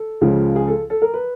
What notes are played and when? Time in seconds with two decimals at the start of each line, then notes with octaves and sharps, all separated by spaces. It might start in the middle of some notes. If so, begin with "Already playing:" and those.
Already playing: A4
0.21 C#2 C#3 F3
0.56 G#4
0.68 A4
0.90 A4
1.02 A#4
1.14 B4